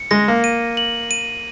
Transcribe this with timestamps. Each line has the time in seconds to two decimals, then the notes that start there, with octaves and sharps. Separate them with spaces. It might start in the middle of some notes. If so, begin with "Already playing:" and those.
Already playing: C#7
0.11 G#3 A#6
0.28 A#3
0.44 D#7
0.77 F#7
1.11 D#7